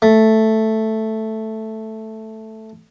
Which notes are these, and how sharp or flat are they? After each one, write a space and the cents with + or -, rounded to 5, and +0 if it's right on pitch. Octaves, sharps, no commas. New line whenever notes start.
A3 +0